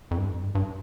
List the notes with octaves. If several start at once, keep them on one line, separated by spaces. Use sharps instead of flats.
F2
G2
F2
G2
G2